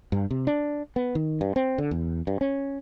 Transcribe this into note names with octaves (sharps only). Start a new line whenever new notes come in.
G2
C3
D4
B3
D#3
G2
C4
D3
E2
G2
C#4